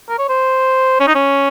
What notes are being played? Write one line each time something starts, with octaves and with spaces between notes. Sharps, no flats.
A#4
C#5
C5
C#4
D#4
C#4